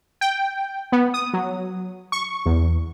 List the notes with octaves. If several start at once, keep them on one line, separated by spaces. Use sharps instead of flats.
G5
B3
D#6
F#3
C#6
E2